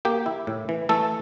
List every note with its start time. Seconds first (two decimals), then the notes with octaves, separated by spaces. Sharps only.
0.05 A#3 G4
0.26 E4
0.47 A2
0.69 E3
0.89 E3 A3 A4